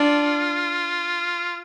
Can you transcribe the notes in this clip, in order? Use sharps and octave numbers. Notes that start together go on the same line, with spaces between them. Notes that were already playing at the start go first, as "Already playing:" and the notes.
Already playing: D4 F4